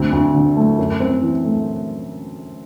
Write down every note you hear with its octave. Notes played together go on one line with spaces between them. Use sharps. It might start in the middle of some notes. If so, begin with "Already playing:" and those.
Already playing: D2 A3 C4
D2
D3
A3
F#2
C4
E3
A3